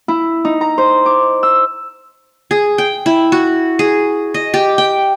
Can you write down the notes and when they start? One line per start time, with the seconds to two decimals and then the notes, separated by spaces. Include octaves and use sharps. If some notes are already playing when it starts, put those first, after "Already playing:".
0.08 E4
0.45 D#4
0.61 A#5
0.78 C5
1.06 D6
1.43 E6
2.51 G#4
2.78 G5
3.06 E4
3.32 F#4
3.79 G#4
4.34 D#5
4.54 G4
4.78 G5